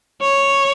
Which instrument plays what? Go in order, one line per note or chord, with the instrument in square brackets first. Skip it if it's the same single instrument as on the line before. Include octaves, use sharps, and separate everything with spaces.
[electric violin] C#5